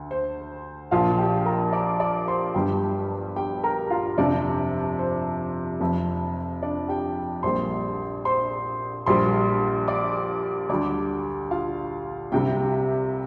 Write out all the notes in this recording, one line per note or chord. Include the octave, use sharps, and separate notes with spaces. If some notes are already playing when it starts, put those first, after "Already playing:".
Already playing: D2 D3
C5
A#1 A#2 F3 F4 F5
G4 G5
A#4 A#5
D5 D6
D5 D6
C5 C6
G1 G2 G3 G4 G5
G4 G5
A#4 A#5
F4 F5
F1 F2 C3 F3 D4 D5
C5
F1 F2 F3
D4 D5
G4 G5
A#1 A#2 G3 C5 C6
C5 C6
A#1 A#2 G3 C5 C6
D5 D6
D2 D3 G3 D5 D6
F4 F5
C2 C3 G3 G4 G5